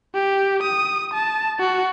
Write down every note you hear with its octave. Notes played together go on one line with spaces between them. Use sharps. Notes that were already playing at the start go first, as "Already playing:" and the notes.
G4
D#6
A5
F#4